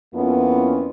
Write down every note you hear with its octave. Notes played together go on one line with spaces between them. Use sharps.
F2 A#3 B3 C#4 E4 F4